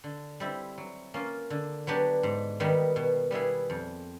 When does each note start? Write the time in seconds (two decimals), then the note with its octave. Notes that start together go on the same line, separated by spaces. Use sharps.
0.04 D3
0.40 G3 C4 E4
0.78 F#3
1.14 A#3 C#4 F4
1.50 D3
1.87 F#3 B3 D4 G4
2.23 G#2
2.60 D#3 G3 B3 D#4
2.96 B2
3.31 G3 B3 E4 G#4
3.70 F2